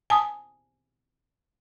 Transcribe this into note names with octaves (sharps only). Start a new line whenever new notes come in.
G#5 A5 D#6